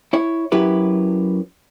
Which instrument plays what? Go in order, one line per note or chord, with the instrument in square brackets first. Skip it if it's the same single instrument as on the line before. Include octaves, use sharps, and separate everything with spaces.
[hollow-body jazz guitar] E4 C#5
F#2 F#3 E4 G4 B4